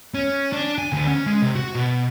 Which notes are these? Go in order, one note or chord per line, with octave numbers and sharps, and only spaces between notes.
C#4
D4
G#5
D2
C#4
G#3
C3
F#4
B2